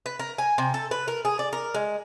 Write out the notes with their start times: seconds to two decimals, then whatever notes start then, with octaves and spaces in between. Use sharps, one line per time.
0.06 B4
0.19 A#4
0.38 G#5
0.58 C3
0.74 A4
0.91 B4
1.08 A#4
1.25 G#4
1.39 D5
1.53 A#4
1.74 G#3